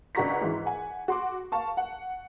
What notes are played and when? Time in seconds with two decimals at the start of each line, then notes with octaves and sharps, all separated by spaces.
0.15 C#2 D4 F#4 A#5 C#6 B6
0.41 G#2 E3
0.66 F#5 G#5
1.08 F#4 C6 D6
1.52 F5 A5 C#6
1.77 F#5